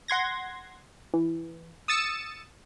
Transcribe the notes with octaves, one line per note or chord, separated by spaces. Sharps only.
F#5 C6 G#6 A#6
E3
D#6 E6 A6 C#7 E7